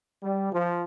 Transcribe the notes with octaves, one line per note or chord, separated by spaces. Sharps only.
G3
F3